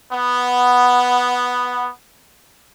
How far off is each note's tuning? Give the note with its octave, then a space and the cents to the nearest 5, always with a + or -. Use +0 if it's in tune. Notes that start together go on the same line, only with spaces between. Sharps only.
B3 +0